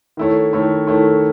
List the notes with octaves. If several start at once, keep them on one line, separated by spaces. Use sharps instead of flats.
D#3 A3 E4 A4 C#5
D#3 A3 E4 A4 C#5
D#3 A3 E4 A4 C#5